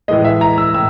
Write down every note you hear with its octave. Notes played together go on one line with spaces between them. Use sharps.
A2 E3 G#3 D#5
E5
A#5
E6
A2 E6